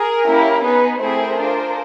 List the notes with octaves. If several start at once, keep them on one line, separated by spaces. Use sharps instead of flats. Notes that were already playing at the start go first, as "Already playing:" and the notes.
Already playing: G#4 A#4
A#3 C#4 E4 G4
B3 D#4 G#4 B4
A3 C4 E4 G#4 A#4 C5
D4 F4 G#4